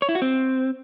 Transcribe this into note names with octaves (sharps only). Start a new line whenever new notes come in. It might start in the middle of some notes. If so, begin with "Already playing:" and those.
C#5
E4
F#4
C4